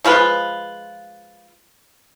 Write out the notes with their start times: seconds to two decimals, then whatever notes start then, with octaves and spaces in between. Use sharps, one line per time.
0.04 F3 G#3 F4 B4